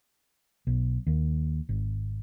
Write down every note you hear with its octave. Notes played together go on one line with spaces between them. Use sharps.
B1
D#2
G#1